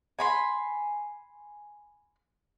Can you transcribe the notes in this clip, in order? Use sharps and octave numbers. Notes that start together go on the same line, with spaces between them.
G#5 B5 C6